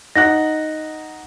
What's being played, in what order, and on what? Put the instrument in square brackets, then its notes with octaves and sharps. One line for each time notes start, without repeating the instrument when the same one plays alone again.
[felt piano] D#4 F#5 F#6 [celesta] A#6